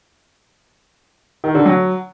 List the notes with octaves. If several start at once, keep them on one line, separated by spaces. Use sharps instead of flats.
D#3
D3
F#3